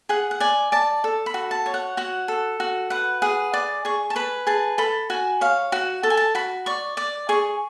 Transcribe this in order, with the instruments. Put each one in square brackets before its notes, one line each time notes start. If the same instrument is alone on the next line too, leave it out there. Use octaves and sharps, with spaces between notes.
[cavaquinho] G#4 F#5
F#5
D5 G#5
D5 A5
A4
B5
F#4
A5
C#5
F#5
F#4 F#5
A4
F#4
B4 F#5
G#4 F#5
D5 D6
G#4 C#6
A5
B4 B5
G#4 A5
A4 B5
F#4 G#5
C#5 F5
F#4 F#5
A4 A5
G#5
A5
F#4 B5
D5 C#6
D5 D6
G#4 C#6